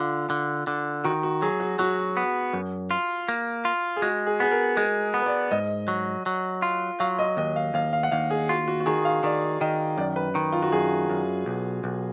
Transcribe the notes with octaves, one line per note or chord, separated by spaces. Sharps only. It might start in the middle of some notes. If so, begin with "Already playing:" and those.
Already playing: D3 F4
D3
D3
D#3 F#4
F#4
F#3 G#4
F#4
F#3 F#4
B3
F#2
F4
A#3
F4
G#4
G#3 F#4
G#4
B3 G#4
A#4
G#3 G#4
B3
B4
D5
G#2 D#5
F#3
F#3
F4
F#3 F5
D#5
D#2 D#5
F5
D#2 F5
F5
F#5
D#2 F5
G#4
F4 F#4
F#4
F#4
D#3 G#4
F5
D#3 D5
D#3 D#5
F#2 D5
B4
D#3
F4
F#4
F#2 G#4
F#2
B1
B1